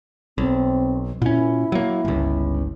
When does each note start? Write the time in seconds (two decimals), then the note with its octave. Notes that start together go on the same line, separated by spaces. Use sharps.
0.38 B1 C4
1.22 A#2 C#4 E4
1.72 F#3 A#3
2.05 G1 C#2